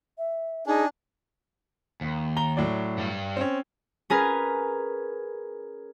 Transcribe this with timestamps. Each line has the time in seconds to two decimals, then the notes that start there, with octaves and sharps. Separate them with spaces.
0.18 E5
0.67 D4 D#4 G#4 G#5
2.01 D#2
2.37 A#5 G7
2.57 A2 F#3 D5
2.98 G2 G3
3.37 C4 C#4
4.10 C#4 G#4 A#4 B4